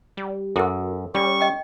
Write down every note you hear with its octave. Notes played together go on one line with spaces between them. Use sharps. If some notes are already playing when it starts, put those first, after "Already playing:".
G3
F#2 F#4 A4 A#4
G3 C#4 C#6
D#5 G5